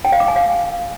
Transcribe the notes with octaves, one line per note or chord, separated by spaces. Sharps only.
G5
F5
D6
G#5
F5